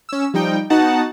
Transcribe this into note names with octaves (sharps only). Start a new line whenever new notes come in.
C#4 E6
F3 G3 D#4 G5
B3 D#4 F#4 F#5 A5